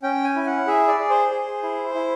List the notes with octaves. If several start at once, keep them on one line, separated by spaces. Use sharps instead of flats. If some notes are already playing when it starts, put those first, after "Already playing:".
C#4 G5
G#5
E4
F#5
G#4 E5
D5
G#4
C5
G#4
E4
E4